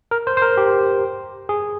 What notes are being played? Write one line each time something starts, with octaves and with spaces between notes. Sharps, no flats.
A#4
C5
C5
A#4
G4
G#4